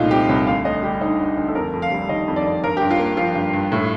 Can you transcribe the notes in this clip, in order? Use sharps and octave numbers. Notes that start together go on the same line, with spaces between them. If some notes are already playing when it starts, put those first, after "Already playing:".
Already playing: C2 A#2 A3 D#4 F4
C4 G4
C2 D#5
D2 F5
D2 D#5
G3 G4
D3 D#4
D2
D2
A4
F2 A#4
F2
F5
G3
D#3 D#5
F2
D5
F2
G2 A#4
G2 G4
F4
A#3
F3 F4
G2
G2
A2